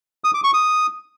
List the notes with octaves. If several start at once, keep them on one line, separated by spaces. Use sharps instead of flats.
D#6
D6
C#6
D#6